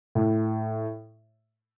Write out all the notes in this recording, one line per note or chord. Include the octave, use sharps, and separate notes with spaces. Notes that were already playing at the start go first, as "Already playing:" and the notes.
A2